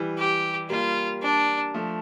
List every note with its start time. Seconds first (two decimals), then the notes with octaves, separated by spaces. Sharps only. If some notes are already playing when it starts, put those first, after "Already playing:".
Already playing: E3 G3
0.18 G4
0.70 G3 A#3 F4
1.22 D4
1.74 F3 A3